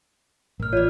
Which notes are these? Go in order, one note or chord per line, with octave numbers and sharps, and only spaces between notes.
A1 A#4 F6
F4 C#5 D5